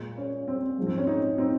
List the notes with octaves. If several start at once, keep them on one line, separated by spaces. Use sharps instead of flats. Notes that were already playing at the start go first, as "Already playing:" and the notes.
Already playing: A#2 G#3
C#4
C4
G#2 F3 G#3
C4
C#4
C4 D#4
C4 D#4